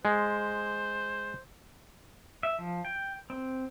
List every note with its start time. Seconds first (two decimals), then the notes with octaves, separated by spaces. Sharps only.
0.05 G#3 C5
2.43 E5
2.59 F3
2.85 G5
3.30 C4